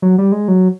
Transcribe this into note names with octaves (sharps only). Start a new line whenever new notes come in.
F#3
G3
G#3
F#3